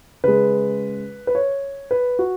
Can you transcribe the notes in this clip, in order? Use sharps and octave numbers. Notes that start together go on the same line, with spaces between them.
C#3 G#3 B4
B4
C#5
B4
F#4